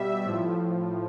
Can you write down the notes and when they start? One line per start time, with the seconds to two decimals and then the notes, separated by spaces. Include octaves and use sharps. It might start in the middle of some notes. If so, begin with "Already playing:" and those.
Already playing: B2 G3 E5
0.25 A2 F3